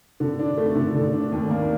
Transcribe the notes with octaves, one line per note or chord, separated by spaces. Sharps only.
D3
D4
A3
D3
D3
D4
D#2
A#3